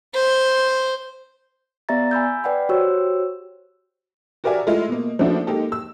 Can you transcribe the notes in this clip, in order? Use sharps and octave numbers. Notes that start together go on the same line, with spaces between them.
C5
B3 G4 D5 E5 A#5 A6
G#5 B5 E6 G6
B4 D5 F#5 G5 B5
F#4 G4 C5 C#5 E6
F#4 G4 A#4 D5 E5 G#5
G#3 A3 E4 F4
B2 A#3
F3 A3 A#3 D4 E4 F#4
G#3 A#3 D#4 G4 A4
E6